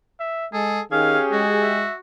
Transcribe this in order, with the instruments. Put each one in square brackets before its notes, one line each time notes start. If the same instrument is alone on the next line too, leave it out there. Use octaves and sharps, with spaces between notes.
[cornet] E5
[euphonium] G#3 [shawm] G#4 [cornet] A4
[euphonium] D#3 [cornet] C#4 [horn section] G4 G#4 [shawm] F5
[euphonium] G#3 [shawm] F#4
[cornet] E5